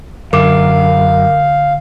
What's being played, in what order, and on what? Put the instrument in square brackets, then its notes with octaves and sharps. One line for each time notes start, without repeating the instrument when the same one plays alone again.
[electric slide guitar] F#2 [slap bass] D3 [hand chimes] A#4 D6 [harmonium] F5